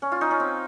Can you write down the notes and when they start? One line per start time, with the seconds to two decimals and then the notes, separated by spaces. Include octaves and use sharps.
0.02 C#4
0.12 F4
0.21 D#4
0.31 C#4
0.40 C4